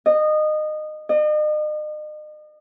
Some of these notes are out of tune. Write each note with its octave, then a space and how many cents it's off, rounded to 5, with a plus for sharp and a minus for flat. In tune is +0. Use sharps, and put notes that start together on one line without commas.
D#5 -20
D#5 -40